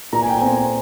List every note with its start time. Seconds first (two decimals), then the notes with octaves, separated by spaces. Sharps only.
0.13 A#2 A#5
0.21 G#5
0.29 G5
0.38 C4 G#5